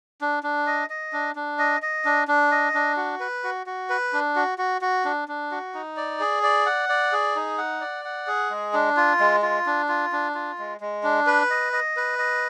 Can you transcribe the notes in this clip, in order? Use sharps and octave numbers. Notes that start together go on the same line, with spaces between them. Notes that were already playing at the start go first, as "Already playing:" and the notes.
D4
D4
D#5
D#5
D4
D4
D#5
D#5
D4
D4
D#5
D4
F#4
B4
F#4
F#4
B4
D4
F#4
F#4
F#4
D4
D4
F#4
D#4
D5
G#4
D5
F#5
D5
G#4
D#4
F#5
D5
F#5
G#4
G#3
D4
F4
G#3
F4
D4
F4
D4
F4
G#3
G#3
D4
B4
D#5
D#5
B4
D#5